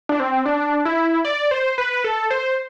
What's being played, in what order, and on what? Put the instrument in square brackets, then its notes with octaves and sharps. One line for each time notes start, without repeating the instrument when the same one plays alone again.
[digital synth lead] D4
C4
D4
E4
D5
C5
B4
A4
C5